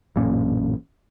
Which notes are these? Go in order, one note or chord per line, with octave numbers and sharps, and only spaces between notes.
A1 F#2 A#2 C#4